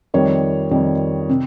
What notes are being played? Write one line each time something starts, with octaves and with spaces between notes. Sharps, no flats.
F2 D#3 G3 C#5
F2 D#3 G3
C3